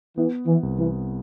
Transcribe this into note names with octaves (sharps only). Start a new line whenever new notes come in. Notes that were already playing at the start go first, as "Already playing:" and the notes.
E3 B3
E3
C2
E3